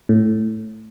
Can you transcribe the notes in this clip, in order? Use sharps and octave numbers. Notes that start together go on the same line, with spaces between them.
A2